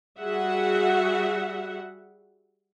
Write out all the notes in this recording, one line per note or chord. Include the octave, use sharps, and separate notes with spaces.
G3 F#4 G#4 E5 F#5